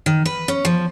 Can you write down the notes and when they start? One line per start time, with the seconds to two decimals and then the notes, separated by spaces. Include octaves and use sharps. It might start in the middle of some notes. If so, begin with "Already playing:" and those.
0.06 D#3
0.26 B4
0.48 C#4
0.65 F3